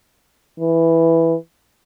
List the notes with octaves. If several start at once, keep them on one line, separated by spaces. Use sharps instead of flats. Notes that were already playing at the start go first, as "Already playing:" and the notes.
E3